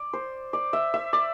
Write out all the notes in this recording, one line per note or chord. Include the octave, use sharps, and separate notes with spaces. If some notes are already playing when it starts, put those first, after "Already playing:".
Already playing: D5
C5
D5
E5
E5
D5